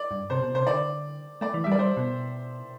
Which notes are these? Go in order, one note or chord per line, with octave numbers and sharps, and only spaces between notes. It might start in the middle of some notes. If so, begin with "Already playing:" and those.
Already playing: D5
G2
C3 C5
B2
C3 C5
D3 D5
A3 D5
E3
E5
G3
D5
G3 C5
B2